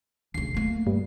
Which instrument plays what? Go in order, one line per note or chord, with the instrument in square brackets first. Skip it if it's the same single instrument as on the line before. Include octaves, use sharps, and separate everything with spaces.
[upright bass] D2 C#3 [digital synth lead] C7
[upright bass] A3 A#3
[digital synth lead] G2